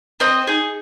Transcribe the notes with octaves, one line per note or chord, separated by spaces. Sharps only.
C4 D#5
D#4 G#4